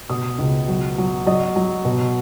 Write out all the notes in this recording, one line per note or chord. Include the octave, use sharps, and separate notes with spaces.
B2 D#6
C#2
F#3
F#3
F#3 D#5
F#3
B2